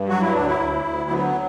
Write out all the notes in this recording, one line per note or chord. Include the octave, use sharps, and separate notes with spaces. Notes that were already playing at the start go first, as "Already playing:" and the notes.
Already playing: G2
F#3 F#4
E4
D2 D4
E4
D2
D2
F#3 B3